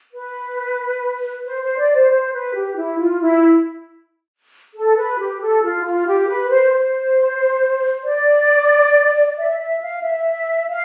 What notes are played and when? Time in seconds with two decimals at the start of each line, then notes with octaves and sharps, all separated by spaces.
0.13 B4
1.45 C5
1.62 C5
1.78 D5
1.95 C5
2.11 C5
2.33 B4
2.55 G4
2.76 E4
2.99 F4
3.21 E4
4.75 A4
4.97 B4
5.19 G4
5.41 A4
5.63 F4
5.85 F4
6.07 G4
6.29 B4
6.51 C5
6.73 C5
8.05 D5
9.37 E5
9.59 E5
9.81 F5
10.02 E5
10.69 F5